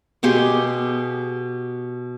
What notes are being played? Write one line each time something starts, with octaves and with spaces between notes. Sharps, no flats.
B2 G4 G#4 C6